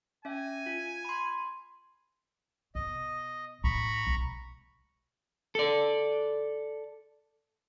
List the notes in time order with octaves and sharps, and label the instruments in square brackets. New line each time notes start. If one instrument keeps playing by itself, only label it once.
[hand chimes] C#4 E5 [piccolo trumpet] G#5
[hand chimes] F4
B5 C6
[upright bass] B2 [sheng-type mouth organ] D#5
[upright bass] A2 [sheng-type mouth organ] A#5 B5 C#6
[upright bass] B1 G#3
[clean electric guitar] A4 D5